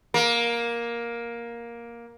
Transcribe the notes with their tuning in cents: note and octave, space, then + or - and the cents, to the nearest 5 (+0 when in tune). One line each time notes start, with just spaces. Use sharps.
A#3 +10